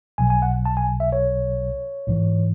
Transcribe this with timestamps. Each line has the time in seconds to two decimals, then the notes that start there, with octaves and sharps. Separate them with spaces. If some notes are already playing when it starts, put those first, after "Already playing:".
0.18 B1 B2 F#3 G#5
0.30 G#5
0.42 F#5
0.65 A5
0.77 G#5
1.00 E5
1.13 C#5
2.07 A1 G#2 E3